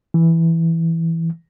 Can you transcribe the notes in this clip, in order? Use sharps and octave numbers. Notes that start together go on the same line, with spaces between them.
E3